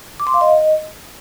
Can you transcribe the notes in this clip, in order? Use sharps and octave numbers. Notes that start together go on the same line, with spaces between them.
D6
C6
F5
D#5